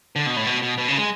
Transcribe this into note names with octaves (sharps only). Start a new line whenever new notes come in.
D3
B2
A2
B2
B2
B2
C#3
G#3